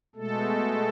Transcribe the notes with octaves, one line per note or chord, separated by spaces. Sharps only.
B2 G#3 A3 A4